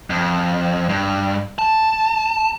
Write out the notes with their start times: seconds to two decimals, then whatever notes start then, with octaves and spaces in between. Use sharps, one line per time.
0.10 F2
0.89 G2
1.59 A5